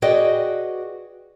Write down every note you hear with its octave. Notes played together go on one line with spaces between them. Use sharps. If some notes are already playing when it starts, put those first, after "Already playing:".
F#4 G#4 B4 D5 D#5 G5